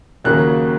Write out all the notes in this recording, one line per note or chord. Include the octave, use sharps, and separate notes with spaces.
D#2 C#3 F#3 A#3 F#6